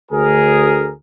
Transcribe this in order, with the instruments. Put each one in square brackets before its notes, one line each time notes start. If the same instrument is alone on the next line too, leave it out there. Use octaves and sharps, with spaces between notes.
[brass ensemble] D2 G#4 A#4